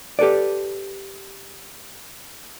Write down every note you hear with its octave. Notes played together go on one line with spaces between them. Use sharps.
G4 A4 B4 D5